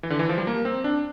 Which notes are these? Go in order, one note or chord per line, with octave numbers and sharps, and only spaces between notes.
E3
D3
E3
F3
G3
A#3
C4
D4